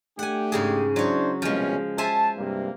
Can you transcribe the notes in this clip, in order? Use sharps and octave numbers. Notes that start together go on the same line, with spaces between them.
A3 D4 G4 F#5 G#5
G#2 C#3 G#4
F#3 D4 E4 C5 C#5
C2 B2 F3 G#3 C#4
C5 E5 G#5 A5
G2 C3 A#3